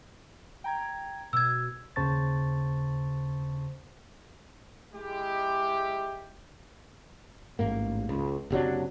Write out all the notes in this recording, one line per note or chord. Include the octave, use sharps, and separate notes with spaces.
G5 A#5 G#6
B2 E6 G#6
D#2 C#3 C5 A5 C#6 A6
G#3 E4 G4
A1 G#2 A#3
C#2
F#1 C3 F#3 D4